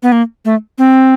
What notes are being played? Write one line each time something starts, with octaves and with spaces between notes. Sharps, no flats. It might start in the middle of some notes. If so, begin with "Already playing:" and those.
B3
A#3
A3
C4